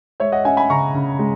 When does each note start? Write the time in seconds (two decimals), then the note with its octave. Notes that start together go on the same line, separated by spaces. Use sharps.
0.20 G#3 C#5 E5
0.32 D#5 F#5
0.45 C#4 E5 G#5
0.57 G#5 B5
0.70 C#3 A#5 C#6
0.94 C#3
1.19 G#3